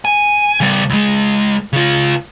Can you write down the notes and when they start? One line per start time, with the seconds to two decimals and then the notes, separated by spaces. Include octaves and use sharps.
0.05 G#5
0.60 C#3 G3
0.89 C#2 G#3
1.73 C#3 F4